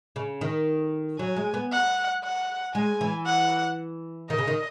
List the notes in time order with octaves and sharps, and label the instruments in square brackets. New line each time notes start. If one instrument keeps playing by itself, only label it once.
[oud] C#3
D#3
[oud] F#3 [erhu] G#5
[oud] G#3
B3
[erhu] F#5
F#5
[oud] G#3 [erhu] G#5
[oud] E3
[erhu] F#5
[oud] D#3 [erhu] D#5
[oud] C#3
D#3